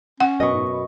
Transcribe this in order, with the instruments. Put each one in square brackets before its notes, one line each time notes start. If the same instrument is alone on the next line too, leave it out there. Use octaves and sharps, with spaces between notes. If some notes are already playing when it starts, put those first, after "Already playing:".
[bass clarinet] C#4 [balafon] F#5
[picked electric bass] F#2 B2 [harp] D#5 C#6
[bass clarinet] G#2
B3